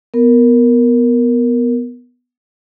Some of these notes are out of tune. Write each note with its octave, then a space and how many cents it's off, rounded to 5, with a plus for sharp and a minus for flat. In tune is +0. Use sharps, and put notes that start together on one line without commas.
B3 +0 A#4 +0